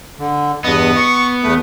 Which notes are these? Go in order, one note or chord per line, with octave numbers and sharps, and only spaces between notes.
D3
E2 G2 B3 D#5
C#6
E2 A3 B4